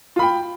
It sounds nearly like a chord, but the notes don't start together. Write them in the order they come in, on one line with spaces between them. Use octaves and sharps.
F4 B5 G5